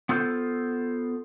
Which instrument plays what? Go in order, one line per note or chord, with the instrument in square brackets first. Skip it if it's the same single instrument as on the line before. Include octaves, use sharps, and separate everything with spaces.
[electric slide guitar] B3 F4 A4 C5